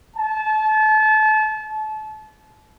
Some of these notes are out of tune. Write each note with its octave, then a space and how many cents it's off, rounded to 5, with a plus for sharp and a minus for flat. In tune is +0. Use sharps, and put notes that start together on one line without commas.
A5 -30